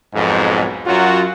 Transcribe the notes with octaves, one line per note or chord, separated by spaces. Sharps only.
B1 F2 G#2
F#2 F#3 F4 F#4